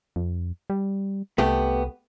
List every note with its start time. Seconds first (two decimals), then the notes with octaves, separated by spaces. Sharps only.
0.16 F2
0.70 G3
1.38 C2 A3 B3 G4